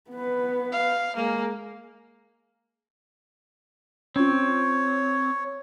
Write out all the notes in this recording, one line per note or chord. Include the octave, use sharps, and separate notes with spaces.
B3 B4
F5
G#3 A#3
C4 C#4 F4 C#5